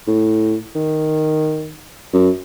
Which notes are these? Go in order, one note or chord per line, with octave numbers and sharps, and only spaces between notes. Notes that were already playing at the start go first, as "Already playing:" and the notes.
A2
D#3
F#2